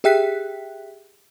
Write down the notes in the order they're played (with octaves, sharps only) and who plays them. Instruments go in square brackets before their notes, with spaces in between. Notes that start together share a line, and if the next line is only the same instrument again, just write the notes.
[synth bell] G4 G#4 E5 G5 F#6 B6